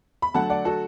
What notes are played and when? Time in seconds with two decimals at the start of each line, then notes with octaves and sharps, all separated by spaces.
0.22 B5
0.34 D3 F#3 A3 F#5 A5
0.50 D5 F#5
0.65 F#4 A4